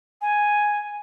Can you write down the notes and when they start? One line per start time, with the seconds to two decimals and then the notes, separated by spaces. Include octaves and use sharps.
0.21 G#5